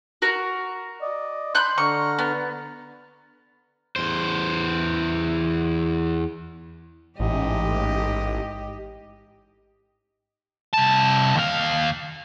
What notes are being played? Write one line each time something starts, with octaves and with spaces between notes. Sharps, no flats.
F#4 A#4
D5 D#5
B5 C6 F#6 G6
D3 A#5 C#6 F6
B3
E2 C5
A1 G#2 G4 D#5
C2 A5
D#2 F5